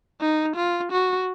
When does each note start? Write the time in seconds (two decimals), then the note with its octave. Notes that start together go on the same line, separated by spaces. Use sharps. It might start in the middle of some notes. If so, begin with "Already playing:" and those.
0.20 D#4
0.56 F4
0.92 F#4